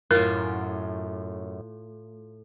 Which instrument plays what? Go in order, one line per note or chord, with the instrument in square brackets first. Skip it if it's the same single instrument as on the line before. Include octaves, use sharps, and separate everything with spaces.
[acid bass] F#2 [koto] A2 F4 [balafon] A#4